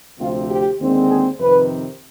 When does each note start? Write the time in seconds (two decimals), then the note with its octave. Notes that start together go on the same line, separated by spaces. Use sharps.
0.19 D2 C3 F3 C4 F4
0.49 G4
0.80 D#2 D3 G#3 C4
1.10 G#4
1.39 F2 C3 D#3 B4